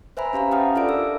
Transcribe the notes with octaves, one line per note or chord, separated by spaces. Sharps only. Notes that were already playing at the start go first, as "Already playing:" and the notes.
B4 C5 E5 G#5 A#5 B5
C#4 G4 F5 A#5
F#5 G5 A5 D#6 F6
D4 F4 A4 D5 E5 D7
A#4 E6